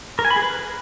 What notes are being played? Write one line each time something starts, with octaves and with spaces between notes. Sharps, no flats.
A#4
G#5
B5
G#4
B4